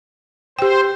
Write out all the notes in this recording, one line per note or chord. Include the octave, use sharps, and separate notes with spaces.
G4 C5 G5